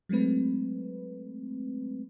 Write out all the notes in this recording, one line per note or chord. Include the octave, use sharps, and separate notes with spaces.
F#3 G#3 A3 C4 B4